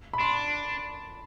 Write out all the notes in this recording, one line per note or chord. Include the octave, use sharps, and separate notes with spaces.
B5
D4 C6